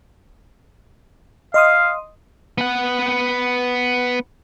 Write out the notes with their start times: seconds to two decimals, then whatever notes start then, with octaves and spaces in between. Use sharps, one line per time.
1.54 D#5 F5 C6 D#6
2.58 B3 F#5